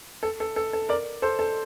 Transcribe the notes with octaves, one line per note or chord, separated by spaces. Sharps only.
A4
A4
A4
A4
A#4 D5
A4 C5
A4